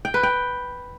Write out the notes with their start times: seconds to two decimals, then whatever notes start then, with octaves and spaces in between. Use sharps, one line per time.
0.05 G5
0.14 B4
0.23 G5